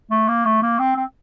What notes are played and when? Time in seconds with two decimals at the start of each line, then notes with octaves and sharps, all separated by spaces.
0.10 A3
0.28 A#3
0.45 A3
0.63 A#3
0.79 C4
0.97 C4